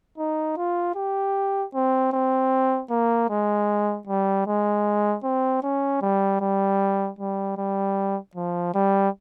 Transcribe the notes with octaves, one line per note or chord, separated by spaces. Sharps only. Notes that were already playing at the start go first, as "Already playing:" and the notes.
D#4
F4
G4
C4
C4
A#3
G#3
G3
G#3
C4
C#4
G3
G3
G3
G3
F3
G3